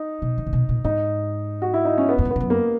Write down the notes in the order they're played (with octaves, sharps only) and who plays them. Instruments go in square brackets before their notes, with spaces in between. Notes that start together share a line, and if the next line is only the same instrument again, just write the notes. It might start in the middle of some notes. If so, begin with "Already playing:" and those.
Already playing: [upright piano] D#4
[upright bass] B2
D#3
A#2
B2
A#2
[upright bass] G#2 [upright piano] D#4
[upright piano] F#4
E4
D#4
C#4
B3
[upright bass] F#2
G#2
[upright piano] B3
[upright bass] G#2
F#2
[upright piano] A#3